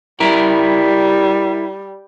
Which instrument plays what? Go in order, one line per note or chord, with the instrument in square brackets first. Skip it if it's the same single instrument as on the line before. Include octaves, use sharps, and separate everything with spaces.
[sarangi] G3 [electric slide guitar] E4 A#4